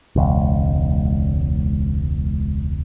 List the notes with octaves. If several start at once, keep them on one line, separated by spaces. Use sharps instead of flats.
E1 C#2